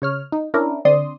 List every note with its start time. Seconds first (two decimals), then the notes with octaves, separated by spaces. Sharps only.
0.02 C#3 C#5 F6
0.32 D#4
0.54 C#4 D4 E4 A#4
0.85 D3 C4 D5 C6 D#6